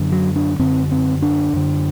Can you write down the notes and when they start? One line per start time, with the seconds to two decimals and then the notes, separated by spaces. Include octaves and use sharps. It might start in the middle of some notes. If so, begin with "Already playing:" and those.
Already playing: F#2 D3
0.12 F#3
0.36 D4
0.59 F#2 D3 C4
0.91 C4
1.22 D4
1.53 F#2 D3